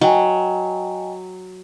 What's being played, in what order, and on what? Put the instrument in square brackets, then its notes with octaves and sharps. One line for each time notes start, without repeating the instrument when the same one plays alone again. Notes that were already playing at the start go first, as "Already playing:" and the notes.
[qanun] F#3 [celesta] D#5 G5 G#5